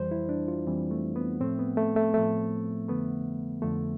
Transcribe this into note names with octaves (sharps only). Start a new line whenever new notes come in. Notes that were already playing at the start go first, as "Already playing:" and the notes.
Already playing: F2 E3 G3 C5
E4
D4
F4
F2 E3 G3 C4
A3
B3
A2 F3 A3 C4
B3
A3
A3
A2 F3 A3
F2 D3 F3 A3 B3
F2 D3 F3 A3